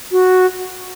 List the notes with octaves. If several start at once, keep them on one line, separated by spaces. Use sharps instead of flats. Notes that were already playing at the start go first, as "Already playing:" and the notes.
F#4